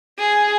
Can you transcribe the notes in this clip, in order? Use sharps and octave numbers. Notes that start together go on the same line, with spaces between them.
G#4